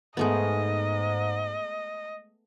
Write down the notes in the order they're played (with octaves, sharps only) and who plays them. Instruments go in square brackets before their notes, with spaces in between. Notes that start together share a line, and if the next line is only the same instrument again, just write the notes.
[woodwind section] G#2 [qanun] G#3 A3 B3 [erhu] D#5